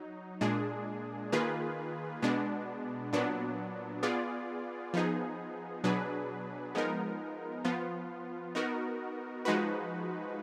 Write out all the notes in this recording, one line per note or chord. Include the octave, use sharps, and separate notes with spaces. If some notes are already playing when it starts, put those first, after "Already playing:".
Already playing: F#3 D#4
A#2 G#3 D4 G#4
D#3 A#3 F4 G#4 B4
B2 G#3 B3 D4
A#2 F#3 B3 D4
B3 F4 G#4 D5
F3 B3 D#4 G#4
B2 F#3 D4 G#4 B4
F3 G#3 B3 D#4 A#4
F3 B3 F4
B3 D#4 F#4 A#4
F3 G#3 D#4 F#4 B4